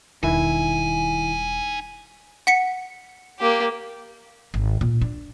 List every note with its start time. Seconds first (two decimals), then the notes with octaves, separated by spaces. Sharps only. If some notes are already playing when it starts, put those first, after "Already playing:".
0.23 E1 D#3 G3 D#4 E4 G#5
2.47 F#5 B6 C#7
3.39 A#3 G4
4.54 G#1
4.81 A#2
5.02 D4